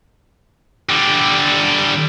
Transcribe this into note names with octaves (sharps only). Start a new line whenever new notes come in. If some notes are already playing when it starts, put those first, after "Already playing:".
D3 G3